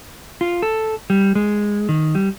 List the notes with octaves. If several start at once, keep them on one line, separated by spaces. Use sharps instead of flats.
F4
A4
G3
G#3
D#3
G3